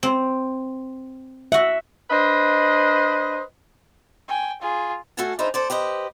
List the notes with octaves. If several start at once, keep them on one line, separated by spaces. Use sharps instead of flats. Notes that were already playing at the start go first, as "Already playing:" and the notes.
C4
F#4 E5 F#5
D4 B4 C5 D#5
G5 G#5
F4 G#4
A3 F#4 A4 F5 G#5 A5
D4 D#4 G#4 B4 C5 E5
A4 C5 D5
G4 B4 C5 D#5